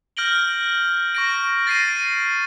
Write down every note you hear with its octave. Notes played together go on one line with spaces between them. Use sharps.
F6 G6 A#6 D7 F#7 G7
C#6 A#6 D7
A6 A#6 C7 D7 D#7